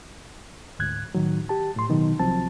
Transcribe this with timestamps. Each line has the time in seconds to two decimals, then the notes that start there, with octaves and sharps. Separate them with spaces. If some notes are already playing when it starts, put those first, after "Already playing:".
0.79 D2 G#2 F#6 G#6
1.15 A2 D#3 F#3
1.49 G4 A5
1.76 A2 C6
1.89 B2 D#3 F#3 D#4
2.19 C2 F3 F#3 C4 A5